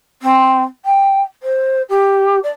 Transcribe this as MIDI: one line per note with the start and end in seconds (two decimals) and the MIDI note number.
0.22 0.63 60
0.85 1.21 79
1.42 1.82 72
1.89 2.39 67
2.43 2.50 74